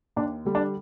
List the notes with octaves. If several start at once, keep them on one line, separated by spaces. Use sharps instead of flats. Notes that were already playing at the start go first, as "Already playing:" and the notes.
D#2 D4
D3 G3
D4